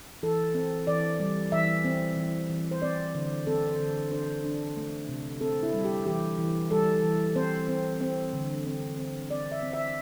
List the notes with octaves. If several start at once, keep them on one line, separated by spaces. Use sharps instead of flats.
E3 A4
C4
E3 D5
G3
E3 E5
C4
E3
E3
C5
C4 D5
D3
C4 A4
C5
D3
D4 C5
D4
A3
C3
C4 A4
E4
G3
G4
E3 G4
E3
G3 A4
E3
C4 C5
C4
C4
D3
C4
C4
C4 D5
E5
C4
E5